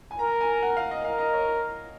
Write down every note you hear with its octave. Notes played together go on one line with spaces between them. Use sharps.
G#5
A#4 A#5
G#5
F#5
F5
D#5
A#4 F5
D#5
C#5